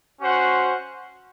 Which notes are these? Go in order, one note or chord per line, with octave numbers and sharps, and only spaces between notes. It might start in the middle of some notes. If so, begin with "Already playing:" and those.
C#4 F#4 C5 F#5